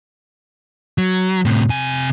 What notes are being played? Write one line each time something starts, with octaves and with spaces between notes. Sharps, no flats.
F#3
A2 C3
C3 G#5